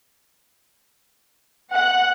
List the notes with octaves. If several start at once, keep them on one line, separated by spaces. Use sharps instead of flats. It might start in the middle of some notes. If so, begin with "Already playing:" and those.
F#5